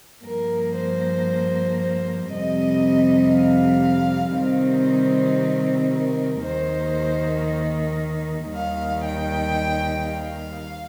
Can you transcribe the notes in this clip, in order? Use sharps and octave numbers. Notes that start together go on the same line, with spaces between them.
G2 F3 A#3 A#4
C5
C5
F2 C3 G3 C4 D#5
F5
C3 D#3 G3 C4 C5
A#4
D#2 D#3 A#3 C5
D#2 D#3 G3 F5
G5
F5